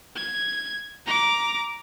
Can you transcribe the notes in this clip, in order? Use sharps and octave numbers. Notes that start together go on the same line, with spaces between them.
G#6
A#5 D6